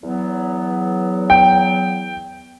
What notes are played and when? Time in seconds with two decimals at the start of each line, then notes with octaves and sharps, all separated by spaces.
0.01 E2 F#3 B3
1.30 G5